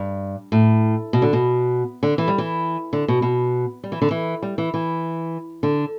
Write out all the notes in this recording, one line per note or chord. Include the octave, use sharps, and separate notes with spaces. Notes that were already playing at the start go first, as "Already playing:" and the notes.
Already playing: G2
A2
B2
D3
B2
D3
E3
G3
E3
D3
B2
B2
G3
E3
D3
E3
G3
E3
E3
D3